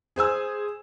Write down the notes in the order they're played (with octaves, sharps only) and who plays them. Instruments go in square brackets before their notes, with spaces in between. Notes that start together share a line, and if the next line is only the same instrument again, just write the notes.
[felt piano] G#4 C5 G#5 E6